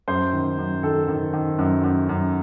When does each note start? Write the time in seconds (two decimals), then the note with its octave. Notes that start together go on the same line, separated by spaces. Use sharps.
0.08 F#2 C5
0.33 D#3
0.58 F#2
0.83 D#3 A4
1.08 D#3
1.33 D#3
1.59 F#2
1.84 F#2
2.09 F#2